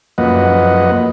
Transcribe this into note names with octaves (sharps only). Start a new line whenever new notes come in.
F#2 F3 A#3 B4 D#5 F#5